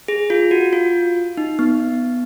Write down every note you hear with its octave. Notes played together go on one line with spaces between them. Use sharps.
G#4
F4
F#4
F4
D#4
B3